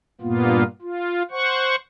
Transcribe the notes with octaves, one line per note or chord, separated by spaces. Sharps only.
G2 A#2 A#3 B3 F4
F4
C5 F#5 C#6